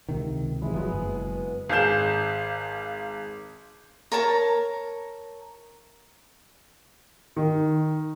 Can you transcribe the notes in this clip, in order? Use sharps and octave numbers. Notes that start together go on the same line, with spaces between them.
C#2 C3 D#3
C3 E3 F#3 G#3 E4
G1 F2 F#3 G#3 B3
F#1
B2
G#1 G#4 F5 G6 E7
A#4 C#5 A5 A#5
D#3